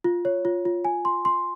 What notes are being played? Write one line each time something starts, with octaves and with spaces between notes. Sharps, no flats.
F4
C#5
F4
F4
G#5
C6
C6